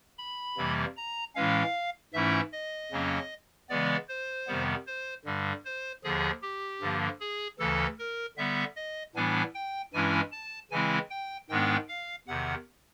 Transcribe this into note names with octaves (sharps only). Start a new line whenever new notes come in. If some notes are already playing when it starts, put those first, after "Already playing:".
B5
F2 C3 E3 G3 A#3
A#5
A2 E3 G#3 C#4 F5
G#2 E3 A3 C#4 E4 E5
D#5
F2 C#3 F#3 A#3 C#4
C#3 E3 G#3 B3 D5
C5
F2 C3 D#3 G3 B3
C5
G2 D3 G3
C5
D#2 D3 F3 G#4
G4
G2 D3 F3 A#3
G#4
D2 C#3 E3 A4
A#4
D3 G3 B3 E5
D#5
A2 E3 G3 B3 D4 G#5
G5
G2 E3 G#3 C#4 E4 G#5
A5
C#3 E3 G#3 C4 E4 G#5
G5
G#2 D#3 G#3 B3 D4 G5
F5
E2 C3 D#3 F#5